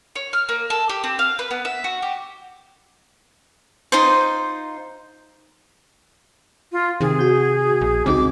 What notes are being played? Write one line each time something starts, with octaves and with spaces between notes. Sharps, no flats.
C#5
F6
A#3
A4
G4
C4
F5
B4
B3
E5
F#4
G4
D#4 F4 C5
F4
C3 D#3 G#4
F#4 G6
A#1
C#2 C4 D#4 F#4 D6